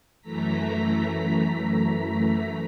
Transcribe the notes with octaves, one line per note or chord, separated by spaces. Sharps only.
F#2 E3 A3 A#5 B6